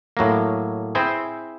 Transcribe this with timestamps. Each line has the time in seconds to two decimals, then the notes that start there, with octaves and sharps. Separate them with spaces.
0.17 A2 F#3 A#3
0.95 C4 E4 G#4 C5